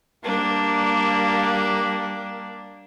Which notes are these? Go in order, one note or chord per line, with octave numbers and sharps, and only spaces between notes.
G3 A#3 D4